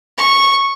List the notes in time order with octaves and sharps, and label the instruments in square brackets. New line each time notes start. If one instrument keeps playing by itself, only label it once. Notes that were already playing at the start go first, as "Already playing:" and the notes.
[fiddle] C#6